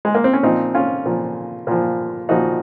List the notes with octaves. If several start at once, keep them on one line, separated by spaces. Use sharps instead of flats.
G#3
A#3
C4
C#4
A#2 F3 C4 D#4
C#4 F4
A#2 F3
A#2 F3
A#2 F3 D#4 F#4